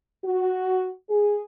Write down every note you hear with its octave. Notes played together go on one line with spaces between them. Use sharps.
F#4
G#4